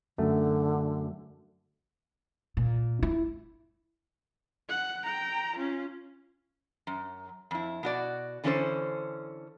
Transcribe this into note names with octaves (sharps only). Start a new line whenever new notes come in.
F#2 D3 A3
A#2
E4
F#5
G5 A#5
C#4 F4
F#2
F2 E4
B2 F#4 D5
D3 E3 C#4 D#4 A4 C5